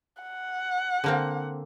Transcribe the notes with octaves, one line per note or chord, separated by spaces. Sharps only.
F#5
D3 A#3 C4